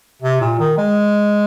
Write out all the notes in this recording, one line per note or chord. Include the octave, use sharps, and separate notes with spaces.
C3
A#2
D#3
G#3